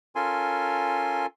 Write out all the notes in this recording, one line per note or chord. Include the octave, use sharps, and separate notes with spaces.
C#4 F4 A4 A#4 G#5 C6